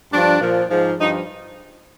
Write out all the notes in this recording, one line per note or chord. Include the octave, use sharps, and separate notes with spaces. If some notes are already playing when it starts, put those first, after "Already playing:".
G2 F3 D4
A#2 F3
G#2 F3
G2 F3 D#4